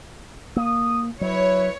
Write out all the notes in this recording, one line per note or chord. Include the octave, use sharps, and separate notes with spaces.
A#3 D#6
F#3 E4 B4 C#5